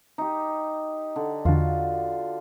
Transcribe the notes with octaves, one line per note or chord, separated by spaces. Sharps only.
D#4 G4
D3
E2 D3 F4 F#4